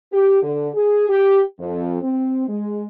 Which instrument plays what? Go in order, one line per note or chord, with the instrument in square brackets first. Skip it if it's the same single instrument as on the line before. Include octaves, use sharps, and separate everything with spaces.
[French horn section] G4
D3
G#4
G4
F2
C4
G#3